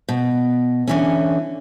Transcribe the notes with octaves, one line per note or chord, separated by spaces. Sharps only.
B2
D3 E3 C#4